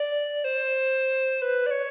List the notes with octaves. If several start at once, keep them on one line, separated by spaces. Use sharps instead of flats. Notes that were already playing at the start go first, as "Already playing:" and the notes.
Already playing: D5
C5
B4
D5
C#5